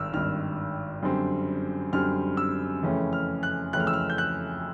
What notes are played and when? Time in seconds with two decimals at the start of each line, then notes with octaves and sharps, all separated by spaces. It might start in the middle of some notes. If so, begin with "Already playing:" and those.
Already playing: G#1 G2 D#3 E6 F6
0.12 G#1 G2 D#3 F6
1.03 F#2 D3 G3 C4
1.93 F#2 D3 G3 C4 F6
2.37 E6
2.82 F2 C#3 E3 A3 C#4
3.13 F6
3.43 F#6
3.73 F2 C#3 E3 A3 C#4 F#6
3.80 F6
3.87 E6
3.93 F6
4.10 G6
4.18 F#6